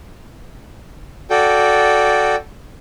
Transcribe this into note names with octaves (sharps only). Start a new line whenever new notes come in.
F#4 A4 D5 G5